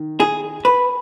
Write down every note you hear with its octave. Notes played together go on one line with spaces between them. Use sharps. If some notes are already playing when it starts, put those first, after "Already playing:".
Already playing: D#3
G#4
B4